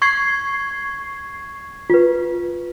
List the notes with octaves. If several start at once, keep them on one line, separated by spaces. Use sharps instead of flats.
C#6 G#6 C7
F4 B4